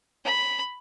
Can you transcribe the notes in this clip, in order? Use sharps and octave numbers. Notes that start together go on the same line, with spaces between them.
B5